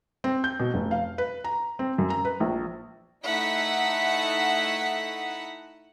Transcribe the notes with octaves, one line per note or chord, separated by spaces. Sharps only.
C4
G6
B2
F1
F5
B4
A#5
C4
F#2
A#5
B4
A#1
A3 D#4 E4 E5 F#5 B6